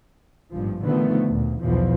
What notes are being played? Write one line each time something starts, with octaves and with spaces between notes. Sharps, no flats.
G#1 G2 A#2 F3
B2 D3 D#3 F3 A3 B3
D2 A#2
B1 E2 B2 E3 F3